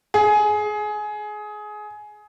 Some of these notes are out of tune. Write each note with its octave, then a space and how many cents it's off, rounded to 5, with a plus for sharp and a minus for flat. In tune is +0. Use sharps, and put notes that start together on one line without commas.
G#4 +20